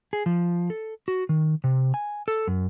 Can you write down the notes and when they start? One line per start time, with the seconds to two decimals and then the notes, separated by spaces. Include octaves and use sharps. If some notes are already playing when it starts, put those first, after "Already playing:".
0.13 G#4
0.26 F3
0.70 A4
1.08 F#4
1.29 D#3
1.64 C3
1.94 G#5
2.28 A4
2.47 F#2